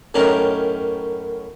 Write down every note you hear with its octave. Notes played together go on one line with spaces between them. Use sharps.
F#2 A2 D#3 C#4 G4 A#4